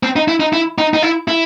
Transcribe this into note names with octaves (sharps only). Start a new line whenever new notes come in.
C4
D#4
E4
D#4
E4
D#4
D#4
E4
E4